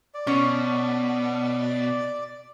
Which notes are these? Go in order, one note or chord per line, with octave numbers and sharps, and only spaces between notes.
D5
B2 C#4 C#5